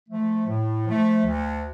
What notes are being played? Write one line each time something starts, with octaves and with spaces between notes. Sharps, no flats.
F3 A3
A2
F3 A3
D2